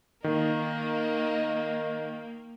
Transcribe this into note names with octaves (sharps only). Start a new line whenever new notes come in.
D#3 A#3 D#5